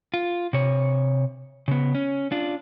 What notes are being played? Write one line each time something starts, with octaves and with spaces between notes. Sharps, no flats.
F4
C3 C#5
C#3 B3
C#4
D4 F4